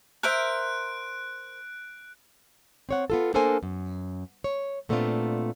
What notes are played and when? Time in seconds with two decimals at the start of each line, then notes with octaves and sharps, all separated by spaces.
0.23 A#4 C5 E5 F#6 D7
2.89 C4 C#5 F#5
3.10 B3 F4 A4
3.34 A#3 D4 A4 A#4 C5 G#5
3.63 F#2
4.44 C#5
4.89 A#2 A3 B3 C4 D4 F4